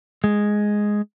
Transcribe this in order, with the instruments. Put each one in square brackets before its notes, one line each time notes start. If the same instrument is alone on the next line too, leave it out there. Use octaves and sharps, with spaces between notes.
[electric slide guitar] G#3